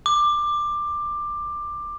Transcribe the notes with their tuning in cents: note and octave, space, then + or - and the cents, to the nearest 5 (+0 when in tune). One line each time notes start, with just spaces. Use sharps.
D6 +15